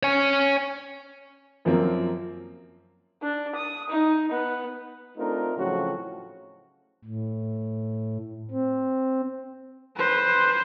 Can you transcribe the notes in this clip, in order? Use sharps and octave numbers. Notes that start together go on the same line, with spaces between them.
C#5 G#5
F#2 F3 F#3 A#3 C4
D4
D#6
D#4
B3
A3 C4 D4 D#4 F4 A#4
A2 C#3 F3 F#3 C4 F#4
A2
C4
B4 C5